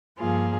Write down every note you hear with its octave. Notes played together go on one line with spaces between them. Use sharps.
G2 F3 A#3 F4 G#4